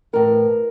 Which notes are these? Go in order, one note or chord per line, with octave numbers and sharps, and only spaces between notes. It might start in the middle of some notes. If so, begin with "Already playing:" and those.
A2 E3 A#4